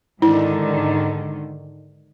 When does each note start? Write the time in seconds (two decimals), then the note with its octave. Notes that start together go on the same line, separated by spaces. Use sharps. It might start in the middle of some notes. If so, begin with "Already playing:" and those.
0.22 G#2 D3 D#3 E4